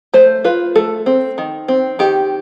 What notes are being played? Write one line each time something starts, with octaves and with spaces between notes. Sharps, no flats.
A3 C5
F4 B4
A3 A4
C4
D#3
C4
D#3 G4